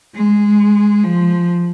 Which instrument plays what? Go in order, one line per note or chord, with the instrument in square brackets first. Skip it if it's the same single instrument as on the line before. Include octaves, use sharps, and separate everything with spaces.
[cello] G#3
F3